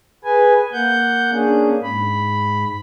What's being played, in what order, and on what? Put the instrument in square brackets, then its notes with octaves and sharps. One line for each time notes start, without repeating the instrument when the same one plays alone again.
[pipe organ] G#4 B4 G#5
A#3 F#5 G6
A#3 C#4 D4 G#4
G#2 B5